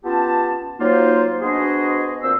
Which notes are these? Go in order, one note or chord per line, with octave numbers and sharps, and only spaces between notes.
B3 C#4 F4 G4 A5
F#3 A#3 D#4 F4 C5
B3 D4 F#4 G#4 C5 D#5
A#2 C4 C5 E6